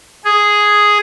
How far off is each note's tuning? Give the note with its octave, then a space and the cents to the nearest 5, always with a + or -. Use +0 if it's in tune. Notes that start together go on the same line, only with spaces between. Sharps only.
G#4 +0